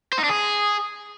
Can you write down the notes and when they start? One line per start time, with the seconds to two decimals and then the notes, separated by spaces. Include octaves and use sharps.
0.13 C5
0.18 D#4
0.24 D4
0.29 G#4